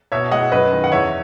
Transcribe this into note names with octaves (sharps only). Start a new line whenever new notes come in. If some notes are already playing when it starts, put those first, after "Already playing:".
B2 C#5 E5
G#3 D#5 F#5
F#2 B4 D#5
D#3 G#3
F#5
E2 C#5 E5